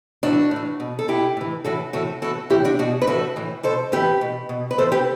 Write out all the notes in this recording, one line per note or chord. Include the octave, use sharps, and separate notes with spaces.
A2 E3 D4 F#4
A2 E3
B2
A4
B2 E4 G4
A2 E3
A2 E3 F#4 A4
A2 E3 F#4 A4
A2 E3 F#4 A4
A2 E3 E4 G4
D4 F#4
B2 D4 F#4
B4
A2 E3 F#4 A4
A2 E3
B2 A4 C5
A2 E3 G4 B4
B2
B2
B4
A2 E3 A4 C5
G4 B4